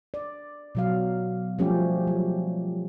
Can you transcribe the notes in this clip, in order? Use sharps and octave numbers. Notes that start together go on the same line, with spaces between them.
D5
B2 F#3 F5
F3 G3 A3 C#4 G4
F#3